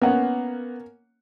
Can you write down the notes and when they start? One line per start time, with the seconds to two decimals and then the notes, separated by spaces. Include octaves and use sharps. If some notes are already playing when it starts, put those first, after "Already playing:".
0.02 A#3 B3 C#4 F#5